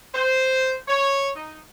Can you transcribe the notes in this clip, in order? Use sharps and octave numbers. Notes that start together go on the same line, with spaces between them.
C5
C#5
D#4